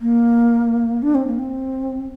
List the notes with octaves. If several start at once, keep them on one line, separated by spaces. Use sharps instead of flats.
A#3
D4
C4
A#3
C4